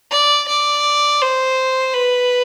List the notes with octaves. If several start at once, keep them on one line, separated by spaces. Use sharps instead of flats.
D5
D5
C5
B4